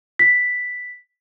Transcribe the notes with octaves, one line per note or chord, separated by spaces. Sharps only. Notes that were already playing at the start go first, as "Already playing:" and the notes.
B6